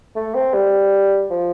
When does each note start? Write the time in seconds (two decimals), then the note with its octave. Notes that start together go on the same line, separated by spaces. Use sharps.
0.16 A3
0.35 C4
0.54 G3
1.31 F3